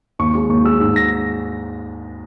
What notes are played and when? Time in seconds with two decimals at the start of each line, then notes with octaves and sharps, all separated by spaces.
0.19 D#2 C#6
0.34 G#3 C#6
0.49 D#2 C#6
0.65 G#3 E6
0.80 G#2 E6
0.96 A#6